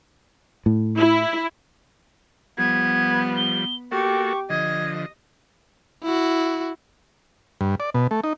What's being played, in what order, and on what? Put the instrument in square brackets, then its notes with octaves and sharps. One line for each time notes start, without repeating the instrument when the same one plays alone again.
[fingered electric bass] A2
[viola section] E4
[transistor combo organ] F3 G3 [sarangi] B3 [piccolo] G#6
[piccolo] G7
[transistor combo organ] A#3 F#4 A4 [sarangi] G4 [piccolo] C#6
[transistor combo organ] D3 F3 [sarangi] D#5 [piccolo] G#6
[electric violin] E4 F#4
[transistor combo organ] G2
D5
B2
A3
D#4